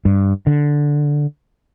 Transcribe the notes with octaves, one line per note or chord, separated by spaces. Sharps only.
G2
D3